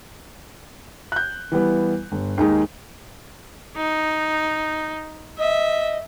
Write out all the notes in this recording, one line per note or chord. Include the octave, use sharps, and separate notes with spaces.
F#6 G6
E3 G3 B3
G1
D#2 G#3 D#4 G#4
D#4
D#5 E5